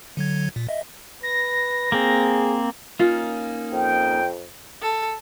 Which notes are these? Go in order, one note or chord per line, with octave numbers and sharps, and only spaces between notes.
D3 F#3 G#6
A#2
D#5 E5
B4 A#6
A#3 C4 G#4
A#3 C#4 D#4 F4
F2 G5
A4